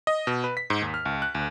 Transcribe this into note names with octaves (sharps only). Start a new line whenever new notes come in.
D#5
B2
B4
B6
G#2
D#2
F6
C#2
F#6
D2